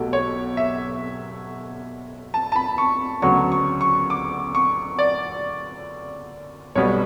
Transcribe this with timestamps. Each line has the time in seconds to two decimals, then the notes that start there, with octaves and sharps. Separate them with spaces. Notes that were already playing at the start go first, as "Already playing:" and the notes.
Already playing: B1 B2 F#3 A3 G4
0.13 C#5
0.57 E5
2.34 A5
2.52 A5
2.56 B5
2.78 C#6
3.22 D2 C#3 F#3 B3 C#6
3.52 C#6
3.81 C#6
4.10 D6
4.55 C#6
4.99 D5
6.75 B1 B2 G3 B3 C#5